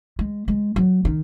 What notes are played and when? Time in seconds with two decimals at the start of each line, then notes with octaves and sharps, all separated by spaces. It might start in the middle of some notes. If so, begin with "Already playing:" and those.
0.19 G#3
0.48 G#3
0.76 F#3
1.05 D#3